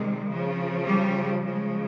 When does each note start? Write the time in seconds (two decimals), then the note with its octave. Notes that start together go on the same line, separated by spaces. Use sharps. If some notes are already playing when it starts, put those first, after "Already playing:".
Already playing: C3 D#3 G3 G#3
0.27 C#3 F3
0.85 G3
1.44 C#3 F3 G#3